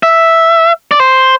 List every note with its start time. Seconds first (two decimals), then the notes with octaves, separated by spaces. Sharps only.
0.03 E5
0.91 D5
1.00 C5